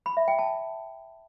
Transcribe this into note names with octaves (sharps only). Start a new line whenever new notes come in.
B5
E5
G5
A5